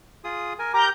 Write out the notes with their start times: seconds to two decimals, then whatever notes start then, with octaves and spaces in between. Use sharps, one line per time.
0.24 F4 G#4 D#6
0.59 A#4 G#5
0.74 G4 A#4 A#5 D6 G6